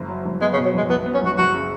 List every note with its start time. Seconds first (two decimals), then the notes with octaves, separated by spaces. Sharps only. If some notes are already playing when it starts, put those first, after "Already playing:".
Already playing: F#1
0.08 F#3
0.25 F#1
0.41 G#3 B3
0.53 C#3
0.57 B2
0.65 F#3
0.74 F#1 G#3
0.90 B1 B3
1.06 B3
1.14 C#4
1.22 B1 F#4
1.38 F#1 F#4
1.54 C#3